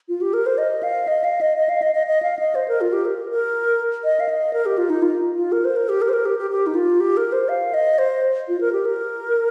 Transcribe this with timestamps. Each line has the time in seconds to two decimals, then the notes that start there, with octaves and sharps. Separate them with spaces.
0.09 F4
0.21 G4
0.34 A#4
0.46 C5
0.58 D#5
0.83 F5
1.08 D#5
1.24 F5
1.41 D#5
1.57 D#5
1.69 F5
1.82 D#5
1.95 D#5
2.07 D#5
2.23 F5
2.39 D#5
2.55 C5
2.68 A#4
2.81 F4
2.93 G4
3.05 A#4
3.30 A#4
4.04 D#5
4.20 F5
4.29 D#5
4.53 A#4
4.66 G4
4.78 F4
4.90 D#4
5.02 F4
5.36 F4
5.52 A#4
5.65 C5
5.76 A#4
5.89 G4
6.02 A#4
6.09 C5
6.13 A#4
6.25 G4
6.39 G4
6.51 G4
6.67 D#4
6.75 F4
7.00 G4
7.17 A#4
7.32 C5
7.49 F5
7.74 D#5
7.98 C5
8.48 F4
8.61 A#4
8.73 G4
8.85 A#4